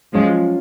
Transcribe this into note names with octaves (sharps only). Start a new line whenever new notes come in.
F3 F#3 G#3 C#4 F4